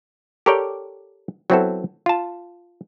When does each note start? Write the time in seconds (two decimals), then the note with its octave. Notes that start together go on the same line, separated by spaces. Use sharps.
0.46 G4 A4 A#4 C#5 D5 G5
1.50 F#3 B3 C4 E4 F#4 A4
2.06 F4 A5